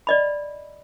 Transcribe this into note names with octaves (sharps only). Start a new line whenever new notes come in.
D5 D#5 B5